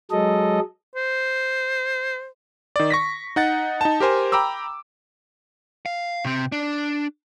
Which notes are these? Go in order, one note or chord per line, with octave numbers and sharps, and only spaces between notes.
F#3 G#3 A4 D#5
C5
D#3 D5
C#6 A#6 B6
D#4 F#5 A6
D#4 A5
G4 A#4 C5 G#5
G5 A#5 B5 D6 E6
F5
C3 C4
D4